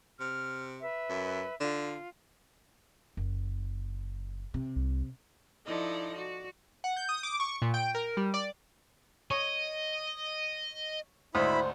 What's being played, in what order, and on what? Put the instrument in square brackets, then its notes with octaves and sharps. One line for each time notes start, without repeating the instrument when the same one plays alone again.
[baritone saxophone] C3 [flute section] F6
[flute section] B4 E5
[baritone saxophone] F#2
[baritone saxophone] D3 [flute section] F4
[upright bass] F#1
C3
[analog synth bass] C2
[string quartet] F3 D#4 E4 A4 D5 D#5
F#4 D5
[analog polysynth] F#5
G6
D#6
D6
C#6
A#2
G5
A#4
G3
D5
[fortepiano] C#5 [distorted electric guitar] D#5
[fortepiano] G#1 D2 D#6 [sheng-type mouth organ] E4 B5 [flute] C5